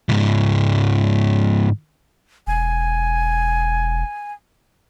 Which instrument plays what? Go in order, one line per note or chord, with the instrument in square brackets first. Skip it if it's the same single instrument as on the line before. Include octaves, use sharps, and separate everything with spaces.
[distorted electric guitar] C#2 G#2
[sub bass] E1 [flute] G#5